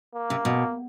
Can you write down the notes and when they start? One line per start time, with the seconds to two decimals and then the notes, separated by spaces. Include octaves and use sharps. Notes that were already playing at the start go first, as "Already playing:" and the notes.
0.15 A#3
0.30 C3
0.45 B2